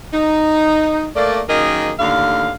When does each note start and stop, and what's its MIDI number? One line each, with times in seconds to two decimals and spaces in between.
0.13 1.06 63
1.16 1.40 57
1.16 1.40 58
1.16 1.40 74
1.48 1.91 42
1.48 1.91 51
1.48 1.91 58
1.48 1.91 68
1.48 1.91 70
1.48 1.91 75
1.99 2.51 39
1.99 2.51 45
1.99 2.51 50
1.99 2.51 77